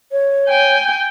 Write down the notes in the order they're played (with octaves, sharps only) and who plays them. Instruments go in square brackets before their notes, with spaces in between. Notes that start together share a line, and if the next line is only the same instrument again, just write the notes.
[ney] C#5
[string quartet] G5 G#5 G6